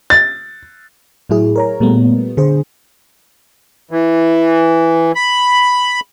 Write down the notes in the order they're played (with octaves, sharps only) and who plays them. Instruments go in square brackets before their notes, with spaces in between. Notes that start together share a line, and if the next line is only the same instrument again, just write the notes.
[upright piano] A6
[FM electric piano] A2 F#3 E4 G#4
A#4 C#5 A#5
A#2 G3 A3 B3
D3 G#4 C5
[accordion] E3
B5